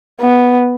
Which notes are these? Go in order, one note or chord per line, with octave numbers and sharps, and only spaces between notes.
B3